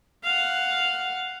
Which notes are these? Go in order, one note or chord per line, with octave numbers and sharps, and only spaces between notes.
F5 F#5